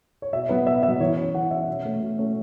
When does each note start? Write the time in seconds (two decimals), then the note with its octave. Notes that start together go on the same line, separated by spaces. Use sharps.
0.22 C#5
0.33 B2 E5
0.49 F#3 B3 B4
0.67 B2 E5
0.83 B3 E5
0.88 F#3
1.00 E3 C#5
1.17 C#4
1.34 E3 F#5
1.51 C#4 E5
1.67 B2
1.85 A3 C#4
2.01 B2
2.18 A3 C#4